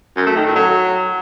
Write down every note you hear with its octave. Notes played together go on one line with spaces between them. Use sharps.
F#2
A3
D#3
A2
F#3